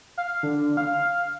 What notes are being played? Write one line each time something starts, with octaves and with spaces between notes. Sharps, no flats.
F5
D3
F5